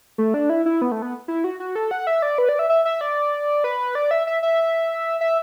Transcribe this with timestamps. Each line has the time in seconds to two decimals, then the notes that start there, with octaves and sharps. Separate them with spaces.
0.18 A3
0.34 D4
0.49 E4
0.66 E4
0.82 B3
0.92 A3
1.02 B3
1.28 E4
1.44 F#4
1.60 F#4
1.75 A4
1.91 F#5
2.07 E5
2.22 D5
2.38 B4
2.49 D5
2.59 E5
2.69 E5
2.85 E5
3.01 D5
3.64 B4
3.95 D5
4.11 E5
4.27 E5
4.43 E5
5.21 E5